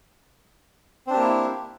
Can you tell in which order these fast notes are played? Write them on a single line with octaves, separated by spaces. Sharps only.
C4 D4 G4 A#3 E4